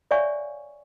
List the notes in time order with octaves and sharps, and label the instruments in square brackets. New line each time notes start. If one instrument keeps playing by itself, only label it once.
[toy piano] C#5 D5 E5 F5 G#5 C#6